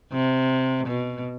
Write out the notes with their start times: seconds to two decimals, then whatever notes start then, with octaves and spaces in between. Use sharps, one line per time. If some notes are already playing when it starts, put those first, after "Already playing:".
0.12 C3
0.87 B2